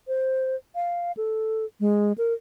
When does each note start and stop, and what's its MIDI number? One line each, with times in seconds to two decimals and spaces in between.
0.08 0.56 72
0.75 1.12 77
1.17 1.65 69
1.80 2.12 56
2.18 2.33 70